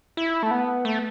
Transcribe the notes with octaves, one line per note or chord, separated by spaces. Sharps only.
E4
A3
B3
A3